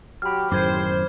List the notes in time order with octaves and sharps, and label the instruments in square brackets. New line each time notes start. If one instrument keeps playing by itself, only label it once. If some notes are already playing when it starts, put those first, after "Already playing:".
[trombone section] F#3 G4 [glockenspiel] B5 F6
[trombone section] A1 G4 [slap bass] F#2 A2 D#3 [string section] C5 [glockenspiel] D6 G#6